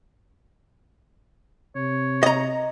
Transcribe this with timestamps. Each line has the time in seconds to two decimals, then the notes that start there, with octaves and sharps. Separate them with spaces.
1.76 C3 C#5
2.23 D#5 A#5